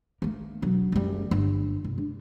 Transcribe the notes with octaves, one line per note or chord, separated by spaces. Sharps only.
A3 A#3
E1 F#3
F#1 G3
G1
C2
D4